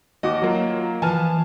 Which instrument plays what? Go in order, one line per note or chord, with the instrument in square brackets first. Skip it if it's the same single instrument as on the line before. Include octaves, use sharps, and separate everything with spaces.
[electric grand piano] D#2 F#4 D6 [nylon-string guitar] D#5
[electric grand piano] F#3 A#3 F4
[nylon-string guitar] E3 F3 [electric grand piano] G#5 A5 F6